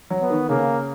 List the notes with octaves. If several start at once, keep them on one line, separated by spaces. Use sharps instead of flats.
F#3
B3
D#3
C#3 A#3